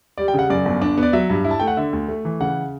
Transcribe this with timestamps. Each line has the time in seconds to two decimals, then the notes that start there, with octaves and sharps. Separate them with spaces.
0.18 G3 D5
0.28 G5
0.34 C#3 F#5
0.50 F#2 D5
0.65 G1
0.82 D4
0.98 B3
1.03 D5
1.13 F#3 E5
1.30 G2
1.45 E4
1.51 A5
1.60 A3 G5
1.67 F#5
1.77 D3 E5
1.93 D2
2.08 A3
2.25 E3
2.40 C#3 F#5